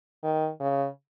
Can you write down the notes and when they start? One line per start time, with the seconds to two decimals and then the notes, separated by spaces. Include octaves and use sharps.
0.23 D#3
0.60 C#3